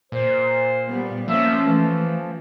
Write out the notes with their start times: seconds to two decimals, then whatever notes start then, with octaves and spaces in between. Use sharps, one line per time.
0.12 A#2 C5
0.87 G3 B3
1.28 F3 A#3 C#4 E5
1.64 E3 A3